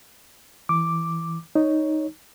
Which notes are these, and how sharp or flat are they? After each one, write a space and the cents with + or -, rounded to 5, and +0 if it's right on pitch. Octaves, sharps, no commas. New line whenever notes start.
E3 +0 D6 +0
D#4 +0 C#5 +0